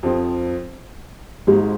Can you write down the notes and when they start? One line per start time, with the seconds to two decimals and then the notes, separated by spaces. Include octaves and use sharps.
0.03 F2 F3 C4
1.47 G#1 G#2 G#3